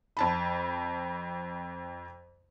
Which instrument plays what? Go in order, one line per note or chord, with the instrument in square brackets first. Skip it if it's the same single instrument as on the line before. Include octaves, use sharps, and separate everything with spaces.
[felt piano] F2 A5 B5